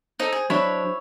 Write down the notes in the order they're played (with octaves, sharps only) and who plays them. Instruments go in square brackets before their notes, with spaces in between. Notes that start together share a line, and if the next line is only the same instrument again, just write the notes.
[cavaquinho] D#4 A4 [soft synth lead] C5
[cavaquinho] G#4
[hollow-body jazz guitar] F#3 D4 [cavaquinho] E4 C#5 B5